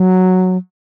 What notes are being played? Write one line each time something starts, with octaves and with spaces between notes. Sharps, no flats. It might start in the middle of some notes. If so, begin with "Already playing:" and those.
Already playing: F#3